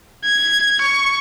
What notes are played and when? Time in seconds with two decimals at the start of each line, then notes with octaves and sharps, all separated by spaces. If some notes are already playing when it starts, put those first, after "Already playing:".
0.25 G#6
0.81 C#6